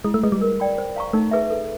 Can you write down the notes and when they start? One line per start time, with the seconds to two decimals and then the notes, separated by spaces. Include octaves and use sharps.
0.05 G#3 E4
0.14 A3
0.23 G#3 G#4 B4 D#5
0.32 G3
0.41 A#4
0.60 D5 G5 B5
0.78 C5
0.96 F5 A#5 C#6
1.13 A3 D#4
1.31 G#4 B4 E5
1.50 A4